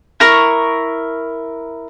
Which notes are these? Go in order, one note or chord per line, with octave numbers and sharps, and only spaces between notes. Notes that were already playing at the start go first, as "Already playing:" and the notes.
E4 A#4 C#6